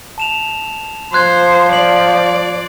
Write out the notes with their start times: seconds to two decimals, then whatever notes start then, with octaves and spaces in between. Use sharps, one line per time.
0.18 A5 E7 F7
1.13 F3 C5 C6 F#6 G#6
1.73 D5 C7 F#7